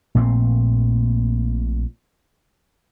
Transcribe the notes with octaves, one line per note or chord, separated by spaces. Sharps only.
A#1 A#2 A3 C4